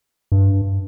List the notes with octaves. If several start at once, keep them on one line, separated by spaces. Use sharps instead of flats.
G2